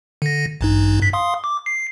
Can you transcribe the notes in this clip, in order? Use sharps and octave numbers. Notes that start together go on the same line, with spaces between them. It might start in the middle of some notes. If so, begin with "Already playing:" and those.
D3 A#6
A1 G2 D#4
G2 B6
F5 C6 D#6
D6
C7